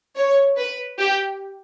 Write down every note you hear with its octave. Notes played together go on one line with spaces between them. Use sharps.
C#5
B4
G4